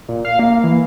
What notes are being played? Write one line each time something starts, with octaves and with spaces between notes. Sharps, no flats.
A#2
F5
A#3
E3